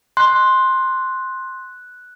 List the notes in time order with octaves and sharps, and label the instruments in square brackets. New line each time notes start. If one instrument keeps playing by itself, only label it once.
[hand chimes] C6 [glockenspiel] F#6